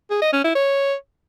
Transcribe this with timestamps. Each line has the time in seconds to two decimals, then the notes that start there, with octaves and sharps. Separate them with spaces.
0.10 G#4
0.22 D#5
0.33 C#4
0.44 E4
0.55 C#5